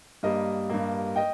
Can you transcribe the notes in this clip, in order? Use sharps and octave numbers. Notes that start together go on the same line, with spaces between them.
G2 G3 A#3 A#4 D#5
G2 G3 A#3
D#5 G5